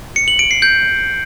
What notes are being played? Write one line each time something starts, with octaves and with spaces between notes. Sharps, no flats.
C#7
F#7
D7
C7
G6